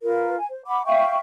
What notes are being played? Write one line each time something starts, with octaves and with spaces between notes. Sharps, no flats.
F4 A#4 B4
G#5
C5
F#5 B5 D6
E5 F5 G5 C#6